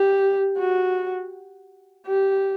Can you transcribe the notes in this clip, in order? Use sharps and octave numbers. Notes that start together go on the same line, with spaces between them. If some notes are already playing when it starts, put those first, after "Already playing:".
Already playing: G4
F#4
G4